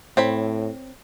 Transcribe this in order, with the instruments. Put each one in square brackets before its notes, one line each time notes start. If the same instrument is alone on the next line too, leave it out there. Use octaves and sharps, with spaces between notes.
[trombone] A2 [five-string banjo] C4 C#5 B5